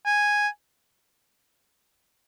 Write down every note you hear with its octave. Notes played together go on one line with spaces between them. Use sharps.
G#5